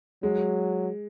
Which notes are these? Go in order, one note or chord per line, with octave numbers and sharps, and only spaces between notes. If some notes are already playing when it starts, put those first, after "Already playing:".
F#3 G#3